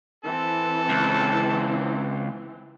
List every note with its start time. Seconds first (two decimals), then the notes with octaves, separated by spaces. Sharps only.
0.24 E3 C4 A4
0.89 C#2